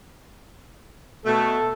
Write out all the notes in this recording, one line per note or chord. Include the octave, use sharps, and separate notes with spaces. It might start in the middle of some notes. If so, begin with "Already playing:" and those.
B2 A3 A4